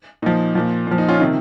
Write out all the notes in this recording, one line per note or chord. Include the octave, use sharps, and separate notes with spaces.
A#2 F3 D#4
A#2 F3
A#2 F3
D#4
C#4 F4
C3 D#3